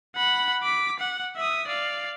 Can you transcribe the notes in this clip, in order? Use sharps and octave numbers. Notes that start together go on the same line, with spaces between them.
F#5 B5
D6 B6
F#5
E5 D#6
D5 F5